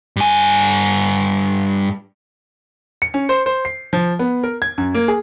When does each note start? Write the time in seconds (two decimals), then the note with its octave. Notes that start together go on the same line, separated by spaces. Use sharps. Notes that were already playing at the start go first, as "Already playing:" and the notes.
0.16 G2 G#5
3.02 C#7
3.14 C#4
3.29 C5
3.46 C5
3.65 C7
3.93 F3
4.19 B3
4.44 A#4
4.62 G#6
4.78 F#2
4.94 A#3
5.08 G#4